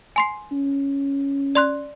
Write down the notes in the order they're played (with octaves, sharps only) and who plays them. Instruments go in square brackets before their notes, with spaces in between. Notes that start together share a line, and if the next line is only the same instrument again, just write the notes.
[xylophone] G#5 C6 C7
[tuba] C#4
[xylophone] D5 C6 F#6